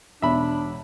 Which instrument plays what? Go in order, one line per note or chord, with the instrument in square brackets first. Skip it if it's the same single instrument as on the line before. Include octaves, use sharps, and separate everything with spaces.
[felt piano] E1 B2 [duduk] D4 [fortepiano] E5 B5